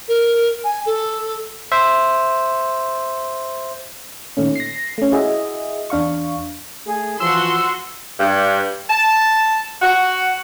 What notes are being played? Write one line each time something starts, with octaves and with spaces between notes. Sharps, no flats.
A#4
G#5
A4
C5 E5
A#2 D#3 A3 C#4
A#6 C7
A3 C#4
E4 F#4 G#4 D#5 E5
E2 D4 F5 C#6
A3 G#4
E3 F3 F#4 C6 E6
G2
A5
F#4